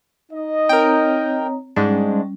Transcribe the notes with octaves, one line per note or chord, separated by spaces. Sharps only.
D#4 D#5
C4 A#4 C#5 G5 A#5
G#2 G3 G#3 C#4 D4